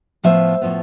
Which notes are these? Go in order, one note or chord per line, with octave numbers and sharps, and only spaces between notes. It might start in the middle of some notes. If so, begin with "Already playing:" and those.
A2 F3 B3 C5 E5
A2 F3 B3